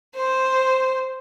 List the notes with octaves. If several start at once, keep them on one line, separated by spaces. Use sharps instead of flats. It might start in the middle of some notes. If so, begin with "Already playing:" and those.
C5